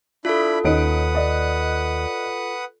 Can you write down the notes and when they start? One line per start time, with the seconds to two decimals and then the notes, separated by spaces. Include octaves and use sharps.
0.25 D4 E4 F4 A4 B5
0.64 D#2 C#4 D#4 B4 F#5 D#6 D7
1.15 D5 D#5